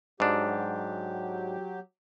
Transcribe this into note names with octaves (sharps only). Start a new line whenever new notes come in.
G#2 F#3 D4 G4